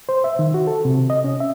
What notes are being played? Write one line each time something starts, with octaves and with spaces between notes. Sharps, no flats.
C5
E5
D#3
F#4
A4
C3
D#5
C#4
E5